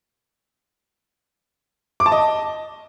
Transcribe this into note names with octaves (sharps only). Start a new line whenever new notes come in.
D6
A5
D#5